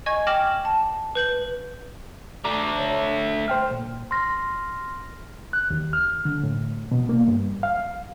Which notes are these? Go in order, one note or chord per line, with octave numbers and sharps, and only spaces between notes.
D#5 G#5 C#6 G#6
G5 D6 F6 A#6 E7 F#7
A5
B4 G6 F#7
A3 D4 A#5 D6
C#5
C5 G5 F6
A#2
C6 F6 A#6
F#6
D#2
F6
D3
A2
B2
A#3
G2
F5